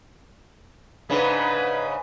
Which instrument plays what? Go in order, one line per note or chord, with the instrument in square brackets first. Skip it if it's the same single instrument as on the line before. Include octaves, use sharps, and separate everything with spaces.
[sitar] G#2 C#3 D4 [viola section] B4